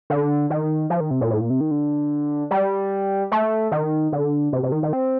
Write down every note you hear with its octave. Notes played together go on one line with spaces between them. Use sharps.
D3
D#3
F3
D#3
C3
A#2
A2
A#2
C3
D#3
D3
G3
A3
D#3
D3
C3
C3
D#3
D#3
C4